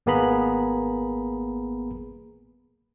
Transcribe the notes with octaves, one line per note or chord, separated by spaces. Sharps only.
G#1 A#3 B3 G#4 A#5 B5